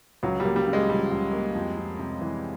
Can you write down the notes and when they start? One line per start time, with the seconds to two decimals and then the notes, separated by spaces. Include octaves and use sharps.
0.23 C#2 F#3
0.40 G3
0.45 A#3
0.56 G3
0.67 C#3
0.73 G#3
0.89 F3 G3
1.11 C#2
1.33 A#3
1.55 F2
1.77 F2
1.99 C3
2.21 E3